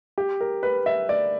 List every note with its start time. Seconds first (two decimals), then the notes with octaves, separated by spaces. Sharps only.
0.18 G4
0.41 A#4
0.63 B4
0.86 E5
1.09 D5